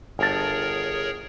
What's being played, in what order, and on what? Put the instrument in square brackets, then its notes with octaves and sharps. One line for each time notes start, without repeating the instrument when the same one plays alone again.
[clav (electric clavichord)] G1 A5 [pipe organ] G#4 A#4 C#5